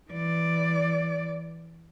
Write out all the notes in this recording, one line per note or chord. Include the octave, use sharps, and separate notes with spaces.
E3 D5